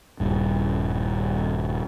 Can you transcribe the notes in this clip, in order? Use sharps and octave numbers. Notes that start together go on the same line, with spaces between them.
D#1 G2